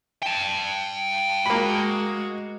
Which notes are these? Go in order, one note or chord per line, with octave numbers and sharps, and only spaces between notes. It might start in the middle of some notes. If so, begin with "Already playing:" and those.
G5 A5
G#3 A#3 F#4 B5